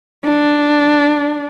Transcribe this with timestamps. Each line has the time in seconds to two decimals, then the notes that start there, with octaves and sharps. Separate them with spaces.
0.25 D4